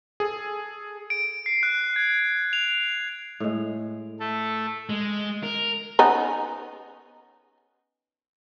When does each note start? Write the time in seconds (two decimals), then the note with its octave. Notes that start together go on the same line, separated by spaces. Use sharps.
0.20 G#4 A4
1.10 D7
1.46 C7
1.63 F#6
1.96 G#6
2.53 F7
3.40 A2 G#3
4.20 A3 A4
4.90 G#3
5.43 A#4
5.99 B3 C#4 D#4